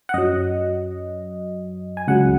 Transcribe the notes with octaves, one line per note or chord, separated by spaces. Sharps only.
F#5
F#2 F#3 D#5
G#5
C#2 C#3 F#3 F#5